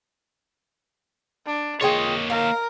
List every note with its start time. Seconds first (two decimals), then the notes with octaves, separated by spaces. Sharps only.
1.46 D4
1.81 A#3 F4 G#4 C#5 D#5 G5
2.30 A#4 F5